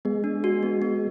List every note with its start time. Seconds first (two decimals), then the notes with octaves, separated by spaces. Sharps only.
0.05 G#3 B3
0.24 D4
0.44 F#4
0.63 B3
0.82 B3